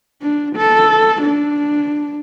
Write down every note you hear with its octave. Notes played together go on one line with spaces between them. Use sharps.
D4
A4
D4